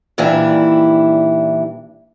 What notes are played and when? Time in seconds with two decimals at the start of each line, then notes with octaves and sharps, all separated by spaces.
0.18 A#2 D#3 E3 G3 D4 E4